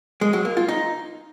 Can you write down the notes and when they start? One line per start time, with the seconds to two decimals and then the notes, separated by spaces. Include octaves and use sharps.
0.21 G#3
0.33 F#3
0.45 A#3
0.57 F4
0.68 D#4